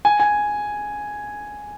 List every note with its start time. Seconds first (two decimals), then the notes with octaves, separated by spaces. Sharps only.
0.05 G#5
0.20 G#5